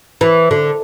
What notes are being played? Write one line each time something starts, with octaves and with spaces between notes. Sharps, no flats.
E3
D3